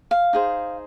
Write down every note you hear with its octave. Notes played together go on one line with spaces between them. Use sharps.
F5
D#4 G#4 C5